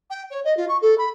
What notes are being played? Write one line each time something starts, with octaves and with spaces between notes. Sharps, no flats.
G5
C#5
D#5
F4
C#6
A4
B5